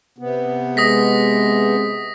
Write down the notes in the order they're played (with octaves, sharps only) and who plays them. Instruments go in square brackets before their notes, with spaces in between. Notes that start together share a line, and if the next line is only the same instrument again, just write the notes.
[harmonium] C3 B3
[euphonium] G#3 [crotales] D#6 A#6 B6